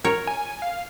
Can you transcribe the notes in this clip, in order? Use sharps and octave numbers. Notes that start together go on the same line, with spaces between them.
A#4 C#5
G#5
F5